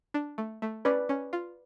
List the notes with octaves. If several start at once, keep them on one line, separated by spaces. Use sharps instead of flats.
D4
A3
A3
C#4 B4 D5
C#4
F4